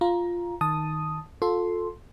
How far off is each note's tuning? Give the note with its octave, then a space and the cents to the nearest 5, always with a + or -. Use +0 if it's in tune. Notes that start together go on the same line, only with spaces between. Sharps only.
F4 +0 A#5 +15
D#3 +0 A5 +0 D#6 +0
F4 +30 A4 +0 C6 +0